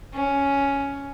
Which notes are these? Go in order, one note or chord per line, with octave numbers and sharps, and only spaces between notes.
C#4